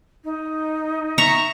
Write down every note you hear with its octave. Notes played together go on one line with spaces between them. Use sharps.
D#4
E5 A#5 C#6